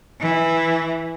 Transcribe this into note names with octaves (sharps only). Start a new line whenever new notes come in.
E3